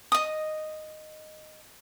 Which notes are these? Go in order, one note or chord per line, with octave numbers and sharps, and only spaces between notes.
D#5 D#6